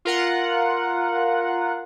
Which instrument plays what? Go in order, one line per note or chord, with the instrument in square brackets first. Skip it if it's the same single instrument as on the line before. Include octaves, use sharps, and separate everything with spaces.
[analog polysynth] F4 A#4 F#5